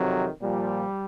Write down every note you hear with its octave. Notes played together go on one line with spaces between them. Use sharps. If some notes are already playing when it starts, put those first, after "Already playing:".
Already playing: F2 C3 D#3 F#3
A#2 F3 G3